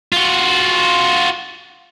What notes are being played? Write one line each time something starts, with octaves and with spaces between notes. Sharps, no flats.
F4 F#4